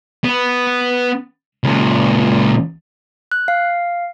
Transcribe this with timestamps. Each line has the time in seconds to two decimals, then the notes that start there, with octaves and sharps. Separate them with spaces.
0.24 B3
1.64 C#2 A#2
3.32 F#6
3.48 F5